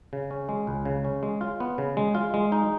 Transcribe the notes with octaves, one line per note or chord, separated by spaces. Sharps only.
C#3
C#4
G#3
C#2
C#3
C#4
G#3
F4
B3
C#3
G#3
F4
G#3
D#4